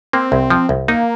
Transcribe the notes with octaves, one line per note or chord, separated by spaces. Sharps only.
A#3 C4
C2
F3
C2
A#3 D#4